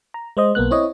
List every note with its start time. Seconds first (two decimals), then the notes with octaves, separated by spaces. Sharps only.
0.14 A#5
0.37 G#3 C5 D#5
0.55 B1 A#3 B3 F#6
0.71 C4 E4 C#5 D#5